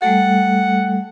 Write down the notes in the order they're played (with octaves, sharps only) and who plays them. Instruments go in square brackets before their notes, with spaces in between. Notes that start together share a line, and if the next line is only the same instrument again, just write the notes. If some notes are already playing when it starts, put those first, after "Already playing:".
[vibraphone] G3 A3 A4 [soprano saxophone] F#5